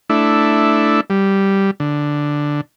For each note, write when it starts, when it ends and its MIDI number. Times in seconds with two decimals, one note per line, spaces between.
0.10 1.00 57
0.10 1.00 62
0.10 1.00 64
1.10 1.71 55
1.80 2.61 50